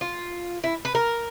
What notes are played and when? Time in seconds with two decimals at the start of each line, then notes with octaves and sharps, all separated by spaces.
0.01 F4
0.64 E4
0.85 B4
0.95 A#4